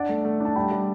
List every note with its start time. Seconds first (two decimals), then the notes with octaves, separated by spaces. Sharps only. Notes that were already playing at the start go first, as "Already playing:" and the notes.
Already playing: D4 D5 F#5
0.09 A3
0.25 A3
0.40 D4 A5
0.56 G3 G5 B5
0.71 G3